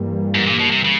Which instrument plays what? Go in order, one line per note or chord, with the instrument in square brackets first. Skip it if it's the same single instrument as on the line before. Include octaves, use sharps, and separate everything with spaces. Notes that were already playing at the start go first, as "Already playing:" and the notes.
Already playing: [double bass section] G2 E3 G3 A#3
[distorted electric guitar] G#2
A#2
B2
C3
C#3